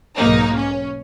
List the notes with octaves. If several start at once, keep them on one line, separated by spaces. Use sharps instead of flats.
B1 G#2 A#3 D#4
C#4